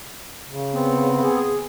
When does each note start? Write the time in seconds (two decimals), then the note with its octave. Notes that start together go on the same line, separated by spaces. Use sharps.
0.50 C#3
0.75 B3 C4
1.23 G#4